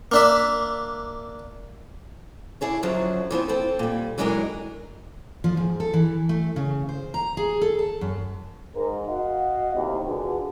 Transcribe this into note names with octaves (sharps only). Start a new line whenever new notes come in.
A#3 D4 E5
D4 E4 G#4 C#5
F#2 D3 F3 F#3
E3 F3 B3 C4
C4 F4 A4
A#2 G3
E3 F#3 G#3 D4 D#4 A#4
F3
G#2
A4
E3
A3
C#3
C5
A#5
G#4
A4
A5
F#2
G#2 A#4
F#4 D#5 F5 F#5
D#2 A2 C3
D3 F4 F#4 G#4 B4